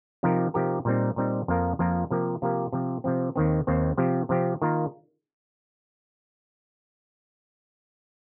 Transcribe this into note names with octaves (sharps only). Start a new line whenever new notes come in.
C3 F3 D#4 G4 A#4
C3 F3 D#4 G4 A#4
A#2 G3 C4 D#4
A#2 G3 C4 D#4
F2 F3 A#3 F4 A#4
F2 F3 A#3 F4 A#4
C3 F3 A#3 G4 A#4
C3 F3 A#3 G4 A#4
C3 F3 C4
C3 F3 C4
D#2 D#3 C4
D#2 D#3 C4
C3 F3 C4 G4
C3 F3 C4 G4
D#3 A#3 F4 A#4